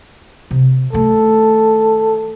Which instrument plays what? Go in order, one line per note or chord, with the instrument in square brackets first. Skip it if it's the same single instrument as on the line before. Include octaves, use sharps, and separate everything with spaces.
[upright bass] C3
[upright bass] D#3 A3 [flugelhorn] A4